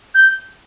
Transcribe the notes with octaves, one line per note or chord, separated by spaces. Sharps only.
G6